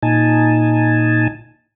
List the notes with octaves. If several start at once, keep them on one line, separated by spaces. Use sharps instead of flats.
A#2 D#4 G#5 A5